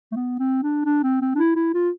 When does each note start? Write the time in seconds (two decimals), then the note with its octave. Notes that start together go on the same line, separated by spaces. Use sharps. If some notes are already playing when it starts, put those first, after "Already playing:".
0.12 A3
0.16 B3
0.39 C4
0.63 D4
0.86 D4
1.03 C4
1.21 C4
1.35 D4
1.38 E4
1.56 E4
1.74 F4